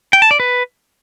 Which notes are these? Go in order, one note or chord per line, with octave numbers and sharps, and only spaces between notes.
G5
A5
D5
B4